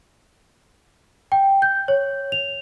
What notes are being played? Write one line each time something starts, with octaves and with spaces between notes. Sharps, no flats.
G5
G6
C#5
F7